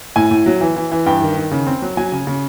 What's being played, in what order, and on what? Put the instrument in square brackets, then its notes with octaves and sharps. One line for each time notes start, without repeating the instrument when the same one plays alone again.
[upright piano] A2 G#5
A2
F#3
E3
E3
E3
G2 G5
D#3
D#3
C#3
C4
F#3
F#3 G#5
C#3
C#3